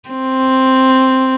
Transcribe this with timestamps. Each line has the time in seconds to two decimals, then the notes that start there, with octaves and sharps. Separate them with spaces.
0.10 C4